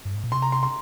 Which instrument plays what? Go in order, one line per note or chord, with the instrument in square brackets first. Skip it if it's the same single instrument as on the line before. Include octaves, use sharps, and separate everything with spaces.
[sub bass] G2
G#2
A#2
[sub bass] C3 [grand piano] C6
[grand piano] A#5
C6
C6